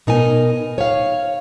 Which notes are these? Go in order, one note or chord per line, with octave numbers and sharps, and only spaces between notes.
B2 D#4 A#4 G#5
C#5 F5